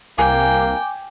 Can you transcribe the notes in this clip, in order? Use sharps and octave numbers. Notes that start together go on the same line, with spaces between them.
C2 A#3 G5 G#5 D6